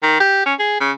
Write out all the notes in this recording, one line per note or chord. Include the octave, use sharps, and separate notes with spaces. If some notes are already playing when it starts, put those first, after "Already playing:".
D#3
G4
C#4
G#4
C#3